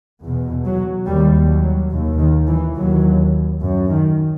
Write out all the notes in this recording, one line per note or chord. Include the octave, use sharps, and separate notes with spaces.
E2 B2
F#3
D#2 G3
F#3
D#2
D#3
E3
D#2 F#3
F#2
D#3